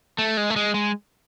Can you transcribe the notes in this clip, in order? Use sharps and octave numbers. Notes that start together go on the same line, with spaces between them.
A3
G#3
A3
G#3
G#3